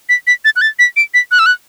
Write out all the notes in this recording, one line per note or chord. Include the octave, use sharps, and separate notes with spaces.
B6
B6
A6
F#6
A6
B6
D7
B6
F#6
E6
F#6